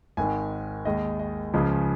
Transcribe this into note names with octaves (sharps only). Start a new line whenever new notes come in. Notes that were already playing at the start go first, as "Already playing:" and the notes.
G#1 G#2 D#3 G#5
D#2 D#3 G#3 D#5
D#5
C#2 C#3 F3 G#3